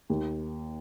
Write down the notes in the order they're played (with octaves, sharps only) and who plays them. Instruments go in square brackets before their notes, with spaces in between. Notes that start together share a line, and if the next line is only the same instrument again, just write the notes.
[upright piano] D#2